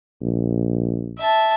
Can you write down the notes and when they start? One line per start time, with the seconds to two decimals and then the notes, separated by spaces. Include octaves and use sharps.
0.21 A#1
1.19 E5 A5